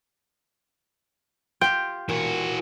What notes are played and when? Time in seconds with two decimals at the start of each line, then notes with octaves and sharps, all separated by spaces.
1.61 F4 G4 G5
2.09 A#2 E3 F#4